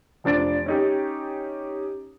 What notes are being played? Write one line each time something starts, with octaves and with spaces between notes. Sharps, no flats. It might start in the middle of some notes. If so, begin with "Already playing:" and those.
F1 F3 D4 A6 D7
C#4 D#4 G4